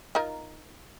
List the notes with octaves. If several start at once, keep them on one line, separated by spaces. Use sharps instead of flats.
D#4 F4 A#4